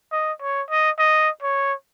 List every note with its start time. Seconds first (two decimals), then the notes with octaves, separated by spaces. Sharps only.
0.12 D#5
0.41 C#5
0.70 D#5
0.99 D#5
1.42 C#5